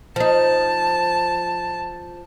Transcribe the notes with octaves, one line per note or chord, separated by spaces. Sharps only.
F3 D#4 A5